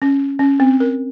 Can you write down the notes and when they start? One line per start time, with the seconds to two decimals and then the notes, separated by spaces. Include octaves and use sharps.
0.02 C#4
0.39 C#4
0.60 C4
0.80 A#4